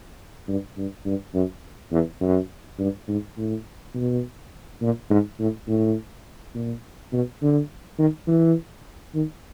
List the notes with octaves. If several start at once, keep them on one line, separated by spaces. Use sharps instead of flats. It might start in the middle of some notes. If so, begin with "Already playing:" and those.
G2
G2
G2
F#2
E2
F#2
G2
G#2
A2
B2
A#2
G#2
A2
A2
A#2
B2
D3
D#3
E3
D#3